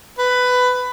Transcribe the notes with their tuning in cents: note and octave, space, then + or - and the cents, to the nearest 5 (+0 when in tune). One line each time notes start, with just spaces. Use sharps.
B4 +15